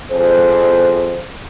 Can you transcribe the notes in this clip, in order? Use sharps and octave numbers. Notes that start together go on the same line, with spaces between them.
F2 G#4 C5